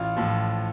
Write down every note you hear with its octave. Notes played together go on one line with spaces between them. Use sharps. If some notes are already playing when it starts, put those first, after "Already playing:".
Already playing: A1 F4
A2 F3